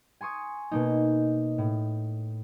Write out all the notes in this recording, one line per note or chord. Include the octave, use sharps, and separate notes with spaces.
G#5 C6 C#6 D#6
B2 A#3 D#4
A2